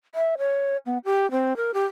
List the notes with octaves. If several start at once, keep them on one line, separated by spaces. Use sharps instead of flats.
E5
C#5
B3
G4
C4
A#4
G4